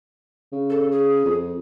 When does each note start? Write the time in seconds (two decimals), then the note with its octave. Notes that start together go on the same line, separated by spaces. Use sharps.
0.52 C#3
0.70 A4
0.92 G#4
1.26 F2